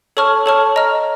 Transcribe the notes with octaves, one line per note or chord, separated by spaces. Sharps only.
A4 C#5 A5 C#6 F6
A4 C#5 A5 C#6 F6
D#5 A#5 F6